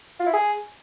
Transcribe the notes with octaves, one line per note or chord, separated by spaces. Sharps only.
F4
E4
G#4